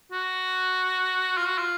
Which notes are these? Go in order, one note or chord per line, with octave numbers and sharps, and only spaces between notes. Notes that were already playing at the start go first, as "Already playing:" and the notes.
F#4
F4
F#4
F4